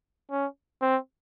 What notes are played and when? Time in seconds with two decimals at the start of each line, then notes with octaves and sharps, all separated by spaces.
0.31 C#4
0.82 C4